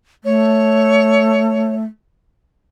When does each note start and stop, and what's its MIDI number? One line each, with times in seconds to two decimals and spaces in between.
0.24 1.84 57
0.24 1.74 73